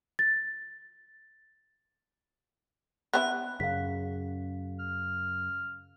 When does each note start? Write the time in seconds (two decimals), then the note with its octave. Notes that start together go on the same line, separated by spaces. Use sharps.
0.19 A6
3.14 B3 C#4 E4 F#6
3.60 F#2 C#3 F5 B6
4.79 F6